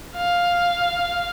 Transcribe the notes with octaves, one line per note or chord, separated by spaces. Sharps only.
F5